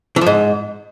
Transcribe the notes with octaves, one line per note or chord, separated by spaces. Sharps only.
E3
F3
G#2